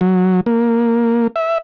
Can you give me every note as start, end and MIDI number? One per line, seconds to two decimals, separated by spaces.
0.01 0.41 54
0.46 1.27 58
1.36 1.58 76